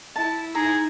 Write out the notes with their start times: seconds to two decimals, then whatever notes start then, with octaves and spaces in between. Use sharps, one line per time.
0.16 E4 A5
0.55 D#4 G#4 A#5